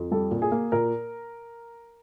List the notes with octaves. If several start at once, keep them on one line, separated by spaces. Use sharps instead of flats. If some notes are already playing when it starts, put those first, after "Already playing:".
Already playing: F2
G3 A4
A#2
G#4
A#3
A#2 A#4